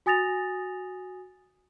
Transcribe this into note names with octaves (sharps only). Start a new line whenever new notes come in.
F#4 G#5 D#6 A6 A#6 F7